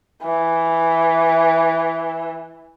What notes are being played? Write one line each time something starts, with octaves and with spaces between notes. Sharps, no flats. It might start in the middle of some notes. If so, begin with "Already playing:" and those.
E3